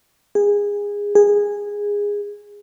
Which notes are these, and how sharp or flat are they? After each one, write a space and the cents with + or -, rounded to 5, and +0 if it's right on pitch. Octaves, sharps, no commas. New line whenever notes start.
G#4 -20
G#4 -15